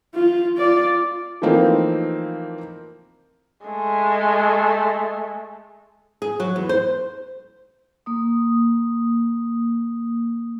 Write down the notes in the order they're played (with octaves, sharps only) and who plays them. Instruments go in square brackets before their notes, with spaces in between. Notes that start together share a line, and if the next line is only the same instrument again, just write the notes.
[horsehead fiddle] F4
F4 D5
[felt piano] E3 F3 A3 A#3 C4 D#4
[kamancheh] G#3 A3
[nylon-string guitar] G#4
F#3
E2
C5
[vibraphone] A#3 D#6